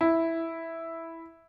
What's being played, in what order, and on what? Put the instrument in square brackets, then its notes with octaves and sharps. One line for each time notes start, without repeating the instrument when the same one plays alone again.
[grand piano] E4